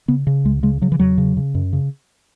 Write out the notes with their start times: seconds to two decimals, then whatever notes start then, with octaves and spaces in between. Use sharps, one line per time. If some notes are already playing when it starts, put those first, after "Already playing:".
0.08 C#3 B3
0.27 C#3
0.45 C#2 G#3
0.63 C#3 G#3
0.82 C#3 F#3
0.92 E3
0.99 E2 F#3
1.18 C#3
1.37 C#3
1.55 F#2
1.73 C#3